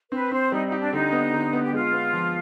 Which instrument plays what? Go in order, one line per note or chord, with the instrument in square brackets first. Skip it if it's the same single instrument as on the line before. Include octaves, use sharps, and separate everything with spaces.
[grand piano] C4 [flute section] B4
[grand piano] C4 [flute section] C5
[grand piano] G3 [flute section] D#4
[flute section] D#4
[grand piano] G4
[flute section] D4
[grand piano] D3 [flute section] D#4
[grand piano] B3
D3
B3
[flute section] G4
[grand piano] G#3 [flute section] F4
[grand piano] B3
F3